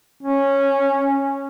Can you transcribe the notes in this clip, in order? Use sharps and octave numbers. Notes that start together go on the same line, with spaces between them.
C#4